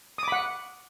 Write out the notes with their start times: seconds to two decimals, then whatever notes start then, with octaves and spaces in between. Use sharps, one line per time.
0.18 D#6
0.23 D6
0.28 B5
0.32 F#5